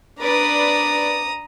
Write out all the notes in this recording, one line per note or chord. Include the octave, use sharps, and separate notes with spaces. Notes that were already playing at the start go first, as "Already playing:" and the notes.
D4 B4 D5 A#5 D#6